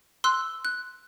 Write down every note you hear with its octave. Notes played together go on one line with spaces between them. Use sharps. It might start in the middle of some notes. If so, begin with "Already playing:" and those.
C6 E6 F#6
F#6